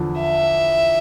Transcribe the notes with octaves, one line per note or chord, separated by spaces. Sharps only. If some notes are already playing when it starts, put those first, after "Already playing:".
Already playing: E2 D3 F3
E5